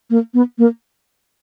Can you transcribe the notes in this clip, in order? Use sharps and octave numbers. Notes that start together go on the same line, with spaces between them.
A#3
B3
A#3